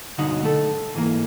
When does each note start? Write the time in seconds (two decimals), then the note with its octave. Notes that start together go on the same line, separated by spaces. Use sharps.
0.18 B1 G2 D3 F#3 D#4 F#5
0.43 A3 A4
0.95 G#2 E3 A#3